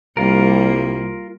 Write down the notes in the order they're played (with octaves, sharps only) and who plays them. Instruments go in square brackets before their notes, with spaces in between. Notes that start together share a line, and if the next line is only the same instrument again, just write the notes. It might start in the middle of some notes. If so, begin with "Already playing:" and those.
[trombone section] C2 [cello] G3 A#3 [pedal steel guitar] F4 A#4